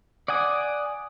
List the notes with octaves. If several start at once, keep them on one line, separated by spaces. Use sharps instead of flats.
D5 F#5 G#5 D#6